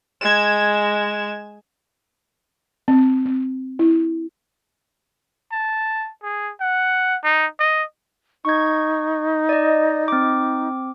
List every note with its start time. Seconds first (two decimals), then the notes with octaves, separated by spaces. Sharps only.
0.21 G#3 G#6 E7
2.88 C4
3.26 C4
3.79 E4
5.52 A5
6.23 G#4
6.61 F#5
7.24 D#4
7.59 D#5
8.45 D#4 C#6 G#6
9.49 D5 D#5
10.08 C4 D6